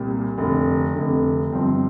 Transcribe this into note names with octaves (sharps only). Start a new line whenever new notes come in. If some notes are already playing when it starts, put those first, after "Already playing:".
Already playing: C2 A#2 G3
F1 F2 D3
F1 F2 D3
G1 G2 F3 C4